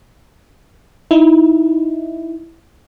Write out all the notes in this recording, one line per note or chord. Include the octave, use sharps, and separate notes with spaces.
D#4 E4